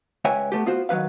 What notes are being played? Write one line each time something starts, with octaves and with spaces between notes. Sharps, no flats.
C#2 B4 C#5 E5 G5 G#5
A3 B3 G4
B3 F4 F#4 C5
D#3 F#3 A#3 B4 F5